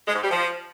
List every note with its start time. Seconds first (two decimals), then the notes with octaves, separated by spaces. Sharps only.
0.07 G#3
0.14 G#2
0.22 G3
0.30 F3